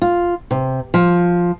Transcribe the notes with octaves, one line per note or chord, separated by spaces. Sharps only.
F4
C3
F3